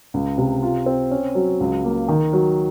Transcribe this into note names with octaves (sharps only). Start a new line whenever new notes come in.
C#2
C3
F4
C4
C#4
F#3
C#2
A#3
D#3
F#3